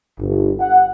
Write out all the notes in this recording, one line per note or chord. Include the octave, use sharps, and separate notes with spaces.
G1
F#5